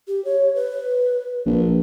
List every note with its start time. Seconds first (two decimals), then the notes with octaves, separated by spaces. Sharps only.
0.08 G4
0.25 C#5
0.55 B4
1.46 A#1